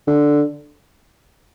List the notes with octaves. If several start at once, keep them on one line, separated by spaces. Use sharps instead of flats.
D3